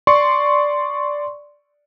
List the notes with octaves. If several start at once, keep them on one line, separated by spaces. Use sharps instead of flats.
D5 C6 C#6